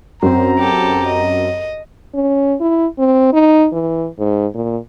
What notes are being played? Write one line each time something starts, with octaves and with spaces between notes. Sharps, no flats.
F#2 C4 C5 A#5
G4 A4
D#5
C#4
E4
C4
D#4
E3
G#2
A#2